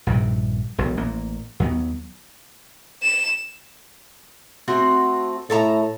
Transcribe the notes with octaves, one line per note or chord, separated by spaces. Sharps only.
A#1 G2 C3 D#3
E1 B1
A1 A#3
D#2 F#3 B3
E7
A3 C4 F#4
A2 A4 A5 A#5